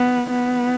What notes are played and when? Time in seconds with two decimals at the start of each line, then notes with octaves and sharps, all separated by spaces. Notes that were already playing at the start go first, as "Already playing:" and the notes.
Already playing: B3
0.30 B3